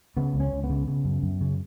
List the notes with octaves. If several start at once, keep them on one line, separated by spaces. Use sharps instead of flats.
C#3 B3
C#2
C#4
C#2
B3
C#3
C#3
F#2
F#2
C#3